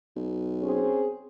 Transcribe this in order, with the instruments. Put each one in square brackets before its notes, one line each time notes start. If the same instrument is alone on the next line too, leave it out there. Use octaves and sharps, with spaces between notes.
[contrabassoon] B1
[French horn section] C4 C#4 G#4